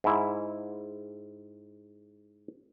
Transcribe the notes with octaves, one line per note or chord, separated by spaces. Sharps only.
G#2 E4